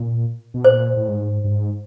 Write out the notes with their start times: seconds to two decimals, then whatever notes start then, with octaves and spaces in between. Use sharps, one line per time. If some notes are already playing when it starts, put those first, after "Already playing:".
Already playing: A#2
0.54 B2
0.64 A#2 C5
0.96 A2
1.08 G#2
1.44 G2
1.50 G#2